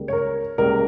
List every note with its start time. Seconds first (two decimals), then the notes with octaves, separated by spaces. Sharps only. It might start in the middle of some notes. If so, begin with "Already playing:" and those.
Already playing: C#2 C#3 G3 A#3
0.08 C#5
0.13 A#4
0.58 C#2 C#3 G3 A#3 A#4